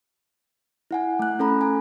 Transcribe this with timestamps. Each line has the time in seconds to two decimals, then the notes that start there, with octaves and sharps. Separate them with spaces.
0.91 E4 F#5 G#5
1.19 A3 F#6
1.39 C#4 A4 A#5 B5
1.61 G#5 A#5